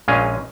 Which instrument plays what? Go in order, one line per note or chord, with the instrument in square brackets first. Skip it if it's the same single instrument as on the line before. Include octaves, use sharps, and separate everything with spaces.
[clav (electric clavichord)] A#1 A#2 G#3 C#4 F5 G#5